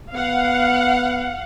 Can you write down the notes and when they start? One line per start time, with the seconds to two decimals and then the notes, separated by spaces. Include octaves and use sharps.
0.14 B3 F5 F#5